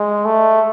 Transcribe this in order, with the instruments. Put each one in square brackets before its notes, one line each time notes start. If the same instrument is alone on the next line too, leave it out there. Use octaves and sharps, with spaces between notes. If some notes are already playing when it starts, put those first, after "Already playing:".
Already playing: [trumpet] G#3
A3